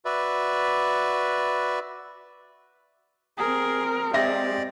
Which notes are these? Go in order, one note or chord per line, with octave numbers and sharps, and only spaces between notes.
F#4 B4 D5 E5
C4 G#4 A#4
G#3 C4 G4 D5 E5 A#6